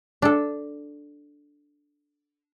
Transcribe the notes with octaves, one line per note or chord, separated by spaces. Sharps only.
D4 A4